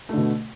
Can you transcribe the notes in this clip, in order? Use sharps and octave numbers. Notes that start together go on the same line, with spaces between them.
B2 D3 A3